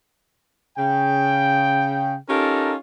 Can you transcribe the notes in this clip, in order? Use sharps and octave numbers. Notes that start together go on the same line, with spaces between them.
C#3 G5
C#4 D#4 F4 G4 A4 A#4